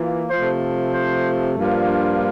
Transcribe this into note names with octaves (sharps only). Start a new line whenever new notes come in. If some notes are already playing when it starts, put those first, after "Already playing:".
Already playing: E3 A#3 F4
C3 F3 A3 C5
C5
G2 F3 A#3 D4 F4